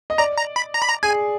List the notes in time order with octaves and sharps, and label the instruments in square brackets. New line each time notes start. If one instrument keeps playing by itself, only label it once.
[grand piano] D#5
[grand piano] D5 [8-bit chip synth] A#5
[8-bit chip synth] A#5
B5
A#5
B5
A#5
[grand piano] G#4 [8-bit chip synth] G#5